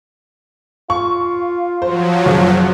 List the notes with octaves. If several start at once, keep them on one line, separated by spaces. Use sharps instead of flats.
F4 C#6
F3 F#3 C5
F#1